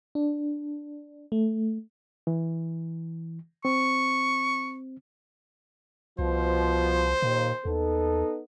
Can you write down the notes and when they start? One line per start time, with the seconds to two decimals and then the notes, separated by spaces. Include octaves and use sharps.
0.15 D4
1.32 A3
2.27 E3
3.65 C4 C#6
6.19 C2 B2 F3 C5
7.22 D#2 A#2
7.65 D#2 B3 D#4 A4